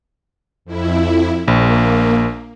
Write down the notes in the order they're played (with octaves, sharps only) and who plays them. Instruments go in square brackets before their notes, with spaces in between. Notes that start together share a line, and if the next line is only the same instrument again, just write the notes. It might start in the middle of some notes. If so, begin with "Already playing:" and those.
[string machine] F2 E4
[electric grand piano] A#1 [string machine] A#3